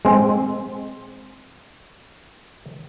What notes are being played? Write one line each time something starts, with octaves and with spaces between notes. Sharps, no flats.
G#3 C4